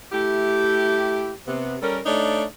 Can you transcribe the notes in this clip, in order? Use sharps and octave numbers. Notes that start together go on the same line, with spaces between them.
A3 E4 G4
C3 B3
G3 C#4 A4 A#4
A3 D4 D#4 C#5 D5